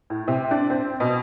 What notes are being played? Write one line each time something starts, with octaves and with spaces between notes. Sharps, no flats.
A2
C3
D4
C4
B2